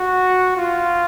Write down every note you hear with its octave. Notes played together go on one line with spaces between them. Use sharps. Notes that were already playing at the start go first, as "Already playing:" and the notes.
Already playing: F#4
F4